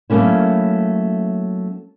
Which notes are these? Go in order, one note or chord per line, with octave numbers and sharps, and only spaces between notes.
F#3 A3 A#3 C#4 E4